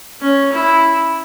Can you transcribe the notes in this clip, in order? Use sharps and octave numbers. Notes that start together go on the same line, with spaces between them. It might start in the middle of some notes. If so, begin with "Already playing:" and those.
C#4
E4